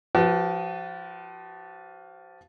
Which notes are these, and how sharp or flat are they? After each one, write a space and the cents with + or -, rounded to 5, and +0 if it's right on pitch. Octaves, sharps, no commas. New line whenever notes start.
F3 +0 F#4 +45 B4 +0